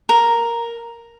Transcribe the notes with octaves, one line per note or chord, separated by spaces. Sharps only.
A#4